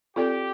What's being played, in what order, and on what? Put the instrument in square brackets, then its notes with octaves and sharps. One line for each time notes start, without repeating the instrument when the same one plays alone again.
[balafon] C4 F4 A4 D5 [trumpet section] G4